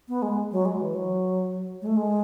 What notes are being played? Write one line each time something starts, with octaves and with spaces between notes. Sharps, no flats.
B3
G#3
F#3
G#3
E3
F#3
G#3
A3
G#3